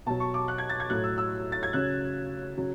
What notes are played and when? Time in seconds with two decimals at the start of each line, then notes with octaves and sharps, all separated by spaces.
0.06 B2 F#3 A5
0.20 C#6
0.34 D6
0.48 F#6
0.58 G#6
0.70 A6
0.80 G#6
0.90 A2 F#3 F#6
1.04 E6
1.18 E6
1.52 A6
1.63 G#6
1.73 C#3 F#3 F#6
2.58 C#3 F#3